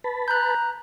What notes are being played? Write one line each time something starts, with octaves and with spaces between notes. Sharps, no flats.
B4 A5 B5
A#5 F#6 G6